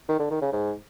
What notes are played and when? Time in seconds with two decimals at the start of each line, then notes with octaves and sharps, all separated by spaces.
0.09 D#3
0.20 D3
0.31 D#3
0.42 C#3
0.53 G#2